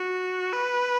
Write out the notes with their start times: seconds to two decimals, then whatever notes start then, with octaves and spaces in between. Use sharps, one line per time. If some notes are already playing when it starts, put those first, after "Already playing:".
Already playing: F#4
0.53 B4